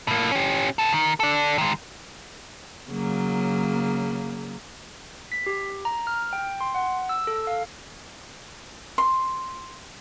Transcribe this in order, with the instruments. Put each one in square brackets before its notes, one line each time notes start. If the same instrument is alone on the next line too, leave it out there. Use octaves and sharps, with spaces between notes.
[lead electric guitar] A2 A#3
C#4 G4
B3 A4
D#3
A4 D5
D#3 G#3
[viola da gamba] C#3 F#3 A#3
[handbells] B6
G4
A#5
F6
G5
C6
F#5
E6
A4
F5
[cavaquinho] C6